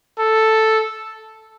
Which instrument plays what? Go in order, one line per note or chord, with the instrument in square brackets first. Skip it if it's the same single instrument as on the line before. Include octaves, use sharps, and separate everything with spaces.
[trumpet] A4